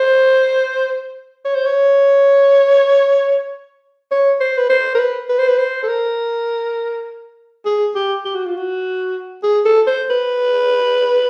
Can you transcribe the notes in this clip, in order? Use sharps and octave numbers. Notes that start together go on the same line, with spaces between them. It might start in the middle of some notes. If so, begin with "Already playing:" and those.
Already playing: C5
C#5
C5
C#5
C#5
C5
B4
C5
A#4
B4
B4
C5
B4
C5
A4
A#4
G#4
G4
G4
F#4
F4
F#4
G#4
A4
C5
B4